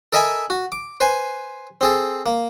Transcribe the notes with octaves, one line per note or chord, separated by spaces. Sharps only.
A4 A#4 D#5 E5 G#5 B5
F#4
D6
B4 C5 G#5
C4 G#4 A4
A#3